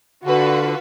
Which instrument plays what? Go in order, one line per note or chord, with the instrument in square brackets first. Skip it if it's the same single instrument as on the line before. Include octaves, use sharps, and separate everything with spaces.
[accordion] D3 [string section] F4 F#4 B4